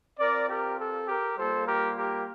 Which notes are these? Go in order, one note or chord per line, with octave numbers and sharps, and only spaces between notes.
C4 F4 A#4 D5
G4 A#4
A4
G4 A#4
G3 A#3 F4 A4 C5
G4 A#4
G4 A#4